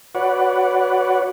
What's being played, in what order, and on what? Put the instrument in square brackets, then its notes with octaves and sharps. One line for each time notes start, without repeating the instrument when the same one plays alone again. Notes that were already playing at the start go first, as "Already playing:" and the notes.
[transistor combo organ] F#4 B4 C#5 D5 F#5